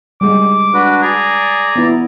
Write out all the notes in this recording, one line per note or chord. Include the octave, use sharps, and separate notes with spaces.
G3 G#3 D6
D4 F#4 B4
G#4 D5 A#5
B3 E4